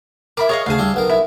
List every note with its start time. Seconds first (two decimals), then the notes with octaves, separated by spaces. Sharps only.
0.37 E4 A#4 B5 D6
0.49 G#4 C#5 D#5 F5
0.66 D2 C#3 G#4 F5 A5
0.79 G3 D4 E4
0.94 B1 B3 A#4
1.09 E4